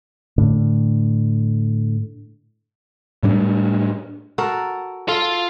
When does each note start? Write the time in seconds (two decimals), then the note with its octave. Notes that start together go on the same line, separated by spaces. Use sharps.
0.38 A2 D3
3.23 A2 G3 D4
4.38 F#4 A4 A#4
5.08 F4 A4